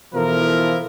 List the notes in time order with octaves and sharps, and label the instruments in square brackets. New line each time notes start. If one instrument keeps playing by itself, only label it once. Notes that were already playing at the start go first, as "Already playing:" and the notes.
[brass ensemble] B2 E3 F3 E4 A4 A#4